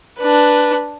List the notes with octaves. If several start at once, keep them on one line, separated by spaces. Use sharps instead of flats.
D4 B4